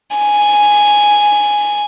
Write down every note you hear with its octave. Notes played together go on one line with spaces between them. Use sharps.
G#5